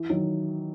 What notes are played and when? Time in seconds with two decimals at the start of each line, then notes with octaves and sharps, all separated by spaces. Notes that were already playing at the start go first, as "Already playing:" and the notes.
Already playing: E3
0.10 D#3 F#3